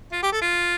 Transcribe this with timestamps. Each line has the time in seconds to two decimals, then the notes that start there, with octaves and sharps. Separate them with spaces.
0.12 F4
0.23 G4
0.32 A4
0.41 F4